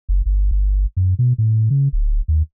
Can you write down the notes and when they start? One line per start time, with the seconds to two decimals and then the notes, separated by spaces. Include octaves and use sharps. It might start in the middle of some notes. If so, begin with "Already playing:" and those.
0.09 F#1
0.26 G1
0.51 G1
0.97 F#2
1.19 B2
1.38 A2
1.70 C#3
1.93 D1
2.28 D#2